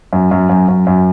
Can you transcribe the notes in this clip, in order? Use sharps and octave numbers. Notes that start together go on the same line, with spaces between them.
F#2
F#2
F#2
F#2
F#2